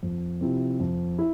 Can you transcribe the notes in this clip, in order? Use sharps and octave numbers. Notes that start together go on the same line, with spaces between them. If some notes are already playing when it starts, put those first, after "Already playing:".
F2
C3 F3 C4 E4
F2
E4